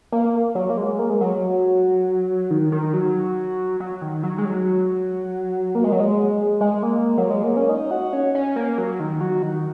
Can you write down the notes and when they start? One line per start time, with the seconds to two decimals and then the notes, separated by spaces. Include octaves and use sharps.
0.12 A#3
0.55 F#3
0.70 A#3
0.77 G#3
0.99 A#3
1.10 G#3
1.21 F#3
2.51 D#3
2.72 D#3
2.93 F#3
3.80 F#3
4.02 D#3
4.23 F#3
4.38 G#3
4.45 F#3
5.75 A#3
5.84 G#3
5.92 F#3
6.00 G#3
6.61 G#3
6.83 A#3
7.18 F#3
7.30 G#3
7.44 A#3
7.57 C#4
7.69 D#4
7.91 F#4
8.13 C#4
8.35 C#4
8.56 A#3
8.78 F#3
9.00 D#3
9.21 F#3
9.43 D#3